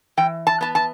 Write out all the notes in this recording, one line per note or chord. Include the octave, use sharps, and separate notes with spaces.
E3 G5
A5
B3 A5
A5